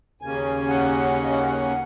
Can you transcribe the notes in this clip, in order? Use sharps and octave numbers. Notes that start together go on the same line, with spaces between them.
D#2 C#3 A#3 C#4 G#5
F#5
F#5
D#5
F#5
F#5